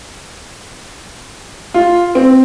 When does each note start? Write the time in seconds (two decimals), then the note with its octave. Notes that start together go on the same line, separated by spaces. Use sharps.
1.74 F4
2.15 C4